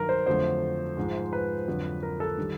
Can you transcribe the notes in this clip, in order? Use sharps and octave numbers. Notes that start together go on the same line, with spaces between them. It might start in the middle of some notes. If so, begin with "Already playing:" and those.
Already playing: G2 D#3 F#3 A#4
C5
F2 D3 F#3 A3 C5
G#2 F3 G#3
B4
F2 D3 F#3
A#4
A4
D#3 G3